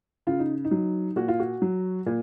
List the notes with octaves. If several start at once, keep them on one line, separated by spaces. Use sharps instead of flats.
C#3 F4
D#4
D#4
F#3
A#2 F#4
F4
F#4
F#3
A#2